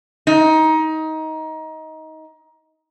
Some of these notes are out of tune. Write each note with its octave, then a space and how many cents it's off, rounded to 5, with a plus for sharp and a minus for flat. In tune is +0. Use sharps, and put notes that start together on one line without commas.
D#4 +20